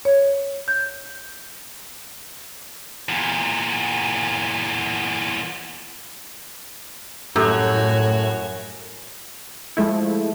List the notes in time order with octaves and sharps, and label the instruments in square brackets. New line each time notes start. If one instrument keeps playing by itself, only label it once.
[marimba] C#5
G6
[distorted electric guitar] E2 A#2
[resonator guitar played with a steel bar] F#2 [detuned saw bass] A2 [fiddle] F#4 C#5 [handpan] G4 A4
[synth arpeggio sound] F3 G#3 A3 E4